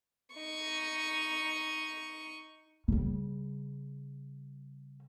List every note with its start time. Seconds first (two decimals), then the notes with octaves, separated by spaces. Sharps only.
0.35 D#4 C#6
2.88 C#3 G3